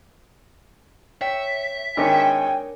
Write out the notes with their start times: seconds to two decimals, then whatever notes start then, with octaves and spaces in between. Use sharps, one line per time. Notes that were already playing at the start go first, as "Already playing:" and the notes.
1.21 C#5 E5 G5
1.97 G#1 D#3 D4 A#4 C#5 G5 G#5